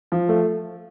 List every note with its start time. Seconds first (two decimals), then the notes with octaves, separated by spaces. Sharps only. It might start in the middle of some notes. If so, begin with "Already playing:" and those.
0.12 F3
0.29 A3